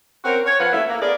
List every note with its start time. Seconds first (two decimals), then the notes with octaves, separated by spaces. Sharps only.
0.24 C4 C#4 F#4 A#4
0.46 C#5
0.60 F3 B4 F5 F#5
0.72 F#2 A3 A#3 E4 E5
0.88 A#3
1.01 B3 G#4 A#4 D5